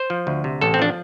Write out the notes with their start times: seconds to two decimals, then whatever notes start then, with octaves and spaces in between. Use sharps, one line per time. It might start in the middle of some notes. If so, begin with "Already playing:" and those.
Already playing: C5
0.10 F3
0.27 D2
0.44 C3
0.61 A1 A4
0.74 C4
0.79 F3 D4